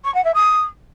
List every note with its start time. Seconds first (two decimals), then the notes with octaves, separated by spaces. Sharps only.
0.05 C#6
0.15 F#5
0.25 E5
0.35 D#6